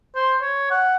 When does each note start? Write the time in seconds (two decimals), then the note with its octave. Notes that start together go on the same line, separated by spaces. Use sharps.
0.15 C5
0.41 C#5
0.71 F#5